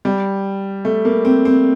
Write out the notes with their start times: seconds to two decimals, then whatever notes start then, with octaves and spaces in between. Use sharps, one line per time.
0.05 G3
0.85 A3
1.05 A#3
1.25 C4
1.45 C4